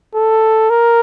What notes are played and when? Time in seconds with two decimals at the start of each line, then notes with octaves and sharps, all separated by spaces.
0.15 A4
0.70 A#4